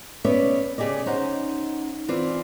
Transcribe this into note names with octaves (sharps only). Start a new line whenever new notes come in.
B3 C#4 D5 E5
C#3 C#4 G4 G#4 D5 D#5
C#4 D#4 C5 F#5
E3 C4 F4 D5